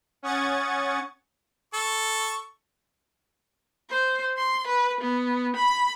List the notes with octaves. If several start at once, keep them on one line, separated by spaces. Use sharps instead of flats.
C#4 F#5 C#6 D#6 G#6 A6
A4 C#6
C5
C6
B4
B3
B5